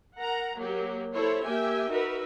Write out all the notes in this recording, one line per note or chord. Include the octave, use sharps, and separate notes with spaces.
A#4 F#5 A#5
F#3 A#3 G4
E4 A4 C5 C#5
A#3 G4 E5 G5 G#5
D#4 F#4 A#4 B4 E5